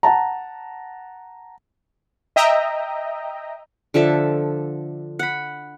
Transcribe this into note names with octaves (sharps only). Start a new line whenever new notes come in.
F#5 A5 A#5
D#5 E5 G5 A#5
D3 F3 A4 E5
F#5 B5